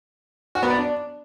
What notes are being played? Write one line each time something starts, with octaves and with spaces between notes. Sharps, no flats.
F#4
B3
D5
D4